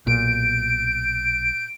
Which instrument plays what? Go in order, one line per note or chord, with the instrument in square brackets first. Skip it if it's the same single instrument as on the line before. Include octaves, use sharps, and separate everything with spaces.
[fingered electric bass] B1 [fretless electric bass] A#2 [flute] G6 [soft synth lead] D7